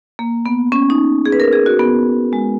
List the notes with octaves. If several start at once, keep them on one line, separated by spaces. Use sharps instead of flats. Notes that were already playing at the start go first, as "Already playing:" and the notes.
A#3
B3
C#4
D#4
G#4
B4
A#4
G#4
F#4
B3
G#3